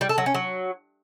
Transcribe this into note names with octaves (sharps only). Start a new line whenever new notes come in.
G3
A4
F#3
C#4
F#3